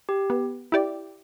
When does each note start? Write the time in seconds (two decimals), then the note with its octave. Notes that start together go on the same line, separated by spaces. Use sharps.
0.09 G4
0.30 B3
0.72 E4 G4 D5